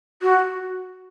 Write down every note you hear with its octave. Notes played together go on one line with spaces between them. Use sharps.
F#4